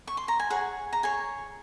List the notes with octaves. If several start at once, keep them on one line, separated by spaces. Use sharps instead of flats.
C#6
C6
A#5
G#5
G#4 C#5 F#5
A#5
G#4 C#5 G#5